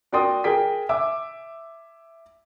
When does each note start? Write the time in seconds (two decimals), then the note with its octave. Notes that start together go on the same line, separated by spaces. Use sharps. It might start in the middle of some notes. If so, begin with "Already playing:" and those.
0.12 F#4 A#4 D5 G5 C6 D#6
0.44 G#4 A#4 G5 G#5 B6
0.89 E5 G#5 D6 E6